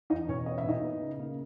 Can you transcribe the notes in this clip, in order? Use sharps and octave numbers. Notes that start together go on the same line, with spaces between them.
E2 D#4 D#5
B2 C#4 C#5
B3 D#5
E5
A#2 D#4 D#5
B3
C#3
A#3